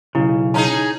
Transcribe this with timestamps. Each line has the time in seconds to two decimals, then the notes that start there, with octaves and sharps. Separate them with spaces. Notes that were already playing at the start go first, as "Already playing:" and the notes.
0.15 B1 C#3 E4
0.54 C#4 D#4 G#4 A5 A#5